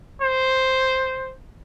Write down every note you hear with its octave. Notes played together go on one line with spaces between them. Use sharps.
C5